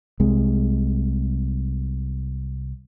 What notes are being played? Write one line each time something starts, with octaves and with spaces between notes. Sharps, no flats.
C2 C3 G#3